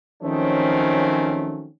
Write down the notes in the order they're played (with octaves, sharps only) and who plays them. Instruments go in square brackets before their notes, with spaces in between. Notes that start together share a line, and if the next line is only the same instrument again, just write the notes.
[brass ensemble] D#3 F3 F#3 A3 C4 C#4